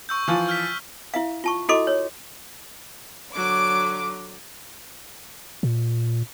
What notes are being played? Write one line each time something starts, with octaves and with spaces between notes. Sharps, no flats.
C#6 E6 G6
E3 F3 F4
F6 G6 B6
E4 E5 F5
F4 A5 C#6
E4 F#4 A4 D#5 C6 D6
C#5
D3 F#3 D6
A#2